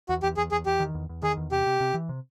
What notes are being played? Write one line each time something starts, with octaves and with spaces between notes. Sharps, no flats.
E2 F#4
E2 G4
E2 G#4
E2 G#4
E2 G4
D#3
E2
E2
D#3 G#4
E2
C3 G4
C3
C3
E3
C3